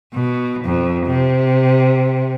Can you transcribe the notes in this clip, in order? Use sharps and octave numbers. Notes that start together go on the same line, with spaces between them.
B2
F2
C3